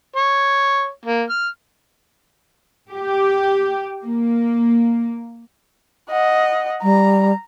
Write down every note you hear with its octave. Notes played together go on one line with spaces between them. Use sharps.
C#5
A#3
F6
G4
A#3
D#5 F#5
G3 A#5